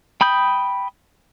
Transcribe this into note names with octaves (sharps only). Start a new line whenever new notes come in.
G5 B5 D#6 G6